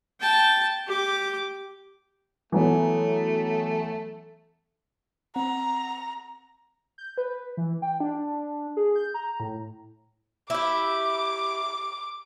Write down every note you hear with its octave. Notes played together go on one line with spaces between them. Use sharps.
G5 A5
G4 D6
E3 F#3 A3 B3
C4 F#5 A#5
G6
B4
E3
G5
D4
G#4
G6
A#5
A2
E4 G4 D6